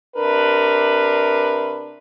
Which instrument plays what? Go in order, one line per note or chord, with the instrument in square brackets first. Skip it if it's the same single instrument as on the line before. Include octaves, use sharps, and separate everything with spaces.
[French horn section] C3 D4 A#4 B4